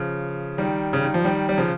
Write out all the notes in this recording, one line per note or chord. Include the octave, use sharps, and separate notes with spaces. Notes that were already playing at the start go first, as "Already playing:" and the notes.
Already playing: C#3 F3
D#3 G3
C#3
D#3
F3
D#3 G3
G3
C#3 F3